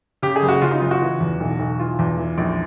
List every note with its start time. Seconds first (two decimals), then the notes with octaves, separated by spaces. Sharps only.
0.22 C#3 G4
0.36 G#4
0.43 F#1
0.49 F#4
0.62 C#3 F4
0.71 D#4
0.81 F#1 F4
0.91 F#4
1.02 E3
1.20 E2
1.40 B1
1.59 B1
1.80 E3 F4
1.99 E2
2.18 E3
2.38 A#1